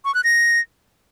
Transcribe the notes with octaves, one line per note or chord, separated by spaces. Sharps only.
C#6
F#6
A#6